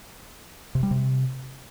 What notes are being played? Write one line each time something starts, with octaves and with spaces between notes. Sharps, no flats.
C3
G3
C3